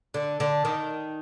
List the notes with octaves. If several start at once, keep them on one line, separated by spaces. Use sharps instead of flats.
D3
D3
D#3